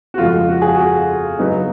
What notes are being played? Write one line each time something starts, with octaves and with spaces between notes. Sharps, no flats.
F#4
F2 C#3 G#3 F4
F#4
G#4
F#4
C#3 F#3 B3 D#4